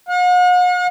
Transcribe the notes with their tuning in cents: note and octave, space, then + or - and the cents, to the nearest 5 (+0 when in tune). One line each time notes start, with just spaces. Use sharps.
F#5 -45